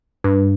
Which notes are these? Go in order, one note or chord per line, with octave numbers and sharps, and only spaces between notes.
G2